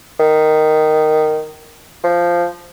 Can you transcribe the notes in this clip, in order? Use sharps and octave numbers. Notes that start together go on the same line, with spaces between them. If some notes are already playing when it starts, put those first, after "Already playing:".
D#3
F3